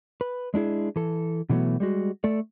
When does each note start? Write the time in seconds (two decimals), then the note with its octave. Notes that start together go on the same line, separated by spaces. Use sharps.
0.21 B4
0.54 G#3 D4 E4 G#4
0.96 E3 A4
1.50 B2 D3 E3 F#3 A3 B3
1.80 G3 G#3 F#4
2.24 A3 A4 D5